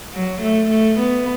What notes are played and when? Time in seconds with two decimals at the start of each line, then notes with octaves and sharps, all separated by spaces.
0.14 F#3
0.42 A3
0.70 A3
0.99 B3